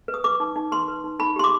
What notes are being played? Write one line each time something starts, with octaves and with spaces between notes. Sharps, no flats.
B4
D#6
B4 D6
D#4
D#4
B4 C6
B4
D#4
D#4 B5
G4 C6
D6